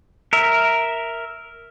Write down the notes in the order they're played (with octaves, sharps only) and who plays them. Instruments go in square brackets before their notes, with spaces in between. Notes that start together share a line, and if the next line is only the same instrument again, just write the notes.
[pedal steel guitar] A#4 E5